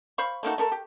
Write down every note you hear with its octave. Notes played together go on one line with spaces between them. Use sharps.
C5 F5 B5 C#6
A3 A#3 D#4 F#4
A3 A4 A#4
G4